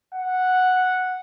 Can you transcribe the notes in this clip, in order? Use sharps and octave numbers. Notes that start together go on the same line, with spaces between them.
F#5